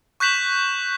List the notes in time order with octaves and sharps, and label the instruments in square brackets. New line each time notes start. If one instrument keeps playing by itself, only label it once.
[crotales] C#6 F#6 G6 B6 E7 F#7